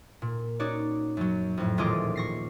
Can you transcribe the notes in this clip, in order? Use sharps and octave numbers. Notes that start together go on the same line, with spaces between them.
A#2
C#4 D#4 F#4 C#5 D5
F#2 F#3
F2 A2
D#1 A1 F4 G#4 D#5 D6
C#6 A#6 C7